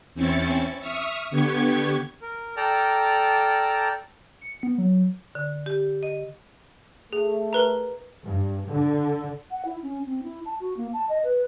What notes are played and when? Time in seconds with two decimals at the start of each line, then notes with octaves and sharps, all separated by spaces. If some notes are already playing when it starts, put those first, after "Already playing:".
0.14 E2 C4 C#4 E4 C#6 A6
0.80 E5 C#6 D#6 F6
1.30 D3 B3 G4 C#6 G#6
2.22 A#4
2.57 A4 D5 G5 A5 A#5 F6
4.41 C#7
4.63 B3
4.78 F#3
5.35 D3
5.66 G4
6.03 D#5
7.13 A3 G#4
7.53 A#4 B4 A#5
8.24 G2
8.71 D3
9.51 F#5
9.65 E4
9.83 C#4
10.06 C4
10.23 E4
10.46 A5
10.60 F#4
10.77 A#3
10.93 A5
11.09 D#5
11.24 B4